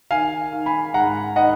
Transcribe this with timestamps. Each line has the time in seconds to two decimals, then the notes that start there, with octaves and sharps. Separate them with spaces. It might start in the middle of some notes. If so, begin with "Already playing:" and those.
0.11 D#3 F5 G#5
0.53 D#3
0.66 G#5 B5
0.94 G#2 F#5 A#5
1.36 D#3 D#5 F#5